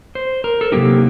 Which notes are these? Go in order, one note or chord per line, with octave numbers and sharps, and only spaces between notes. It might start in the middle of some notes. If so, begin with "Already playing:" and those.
C5
A#4
A4
C3 F#3 A#3 D#4 G4